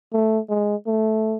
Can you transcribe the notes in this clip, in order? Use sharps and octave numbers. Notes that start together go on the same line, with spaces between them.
A3
G#3
A3